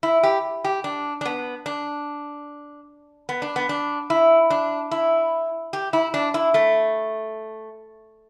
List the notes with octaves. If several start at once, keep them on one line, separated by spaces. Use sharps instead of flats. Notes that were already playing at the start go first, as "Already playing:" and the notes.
E4
G4
G4
D4
D4
B3
D4
B3
D4
B3
D4
E4
D4
E4
G4
E4
D4
E4
A3